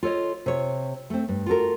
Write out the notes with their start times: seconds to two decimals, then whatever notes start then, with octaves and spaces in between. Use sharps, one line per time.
0.03 F4 A4 C#5 D#5
0.46 C3 C#5
1.10 A3 C4
1.28 G2
1.46 F4 F#4 A4 A#4